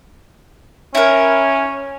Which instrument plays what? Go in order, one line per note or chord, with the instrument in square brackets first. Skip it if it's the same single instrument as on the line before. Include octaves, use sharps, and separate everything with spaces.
[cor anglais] C#4 [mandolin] E4 A#4